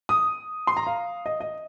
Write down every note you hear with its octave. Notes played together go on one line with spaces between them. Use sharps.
D#6
C6
A#5
F5
D#5
D#5